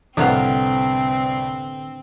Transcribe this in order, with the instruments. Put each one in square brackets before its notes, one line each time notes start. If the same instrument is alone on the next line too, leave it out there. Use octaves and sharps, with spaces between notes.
[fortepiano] C2 [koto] A2 B3 F5 [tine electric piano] D3 [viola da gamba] C4